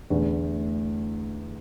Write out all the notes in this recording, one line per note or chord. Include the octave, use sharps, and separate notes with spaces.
E2 D3 A3